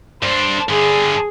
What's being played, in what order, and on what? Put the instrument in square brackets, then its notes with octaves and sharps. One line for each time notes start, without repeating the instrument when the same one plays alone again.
[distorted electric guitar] G2 D4 [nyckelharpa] C5
[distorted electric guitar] G2 D3 [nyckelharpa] G#4